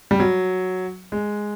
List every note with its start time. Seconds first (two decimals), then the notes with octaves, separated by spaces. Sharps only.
0.11 G3
0.20 F#3
1.12 G#3